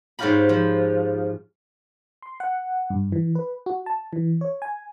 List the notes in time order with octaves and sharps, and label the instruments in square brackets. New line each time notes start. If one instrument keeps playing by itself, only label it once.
[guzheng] G#2 C4 C#4 F4 G4 B5
F3
[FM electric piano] C6
F#5
G2
E3
B4
F#4
A5
E3
C#5
G#5